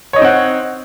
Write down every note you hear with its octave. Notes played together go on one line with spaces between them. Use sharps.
C4 D#4 C#5 D#5 F#5